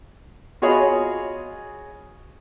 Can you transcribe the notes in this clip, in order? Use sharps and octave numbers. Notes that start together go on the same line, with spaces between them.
F4 F#4 G#4 C#5 D#5 B5